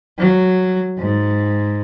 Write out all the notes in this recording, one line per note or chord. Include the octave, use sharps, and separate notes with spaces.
F#3
G#2